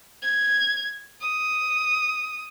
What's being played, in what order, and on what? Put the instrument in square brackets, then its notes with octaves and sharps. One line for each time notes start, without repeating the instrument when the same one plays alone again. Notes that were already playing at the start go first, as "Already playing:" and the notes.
[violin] G#6
D#6